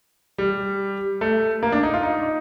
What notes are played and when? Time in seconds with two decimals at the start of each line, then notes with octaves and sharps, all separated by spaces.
0.38 G3
1.21 A3
1.63 A#3
1.72 D4
1.83 D#4
1.94 F4
2.03 D#4